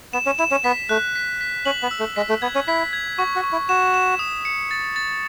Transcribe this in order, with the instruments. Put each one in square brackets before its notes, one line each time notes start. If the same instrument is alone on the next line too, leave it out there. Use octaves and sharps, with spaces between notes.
[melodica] B3 [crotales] E7
[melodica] C#4
[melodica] E4 [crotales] E7
[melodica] C#4
[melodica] B3 [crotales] B6
[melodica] A3 [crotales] F#6
[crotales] B6
B6
[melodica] C#4 [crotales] F#7
[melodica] B3
[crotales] E6
[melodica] A3
[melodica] G#3 [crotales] B6
[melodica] A3
[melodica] B3 [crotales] G#6
[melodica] C#4
[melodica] E4 [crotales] B6
[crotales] G#6
[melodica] F#4 [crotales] C#6
[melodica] F#4
[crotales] C#6
[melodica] E4
[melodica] F#4 [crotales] E7
[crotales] E7
D#6
C#7
A6
A6